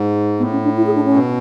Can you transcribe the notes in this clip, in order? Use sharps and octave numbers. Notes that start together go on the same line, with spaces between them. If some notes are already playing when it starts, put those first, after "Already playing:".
Already playing: G#2
A2 B3
C#4
D4
E4
G#4
D4
C#4
B2